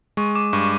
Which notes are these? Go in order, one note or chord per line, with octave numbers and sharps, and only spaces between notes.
G#3 C#6
D6
G2 C#6